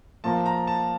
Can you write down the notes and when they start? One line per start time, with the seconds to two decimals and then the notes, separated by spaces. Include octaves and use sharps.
0.24 A#2 F3 A#3 A5
0.46 A#5
0.67 A5